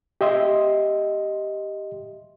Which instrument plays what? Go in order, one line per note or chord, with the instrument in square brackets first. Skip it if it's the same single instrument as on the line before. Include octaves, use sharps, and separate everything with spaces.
[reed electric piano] G4 D#5 E5 C6